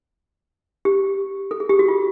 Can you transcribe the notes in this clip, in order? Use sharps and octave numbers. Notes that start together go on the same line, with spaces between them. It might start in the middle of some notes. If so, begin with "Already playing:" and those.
G4
A4
G#4
G4
F#4
F4